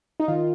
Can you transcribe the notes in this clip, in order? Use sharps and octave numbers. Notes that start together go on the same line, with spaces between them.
D#4
D#3 F4